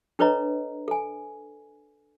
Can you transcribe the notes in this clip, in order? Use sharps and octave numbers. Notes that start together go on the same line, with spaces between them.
D4 A4 B4 C#5 D#5 A#5
A4 G#5